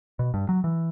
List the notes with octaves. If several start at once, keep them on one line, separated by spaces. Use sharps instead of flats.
B2
G2
F#3
E3